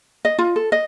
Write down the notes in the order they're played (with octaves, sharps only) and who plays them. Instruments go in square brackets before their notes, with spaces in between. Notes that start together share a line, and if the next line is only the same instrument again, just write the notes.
[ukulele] D#5
F4
A4
D#5